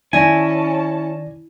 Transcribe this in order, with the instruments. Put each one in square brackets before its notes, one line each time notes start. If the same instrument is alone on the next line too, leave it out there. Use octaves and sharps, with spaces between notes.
[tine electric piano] D#3 D5 A#6 [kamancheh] C#4 A5 [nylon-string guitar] E4 [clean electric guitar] G#5